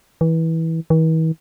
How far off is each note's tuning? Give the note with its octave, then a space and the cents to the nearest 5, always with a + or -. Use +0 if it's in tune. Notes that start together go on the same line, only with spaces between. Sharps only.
E3 -20
E3 -45